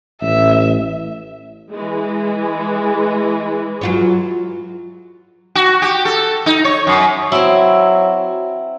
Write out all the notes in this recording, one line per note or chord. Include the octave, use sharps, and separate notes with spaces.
A1 E5
E3 G#3
F#3 F4 C#5
F#4
G4
A4
D#4
C#5
F#2
F#3 C4 E4